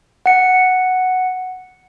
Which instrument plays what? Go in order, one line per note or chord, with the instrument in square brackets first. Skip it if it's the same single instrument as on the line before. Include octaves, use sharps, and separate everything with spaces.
[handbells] F#5 C#7